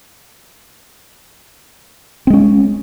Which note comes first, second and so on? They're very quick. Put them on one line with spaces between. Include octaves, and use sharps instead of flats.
C4 G#3 C#4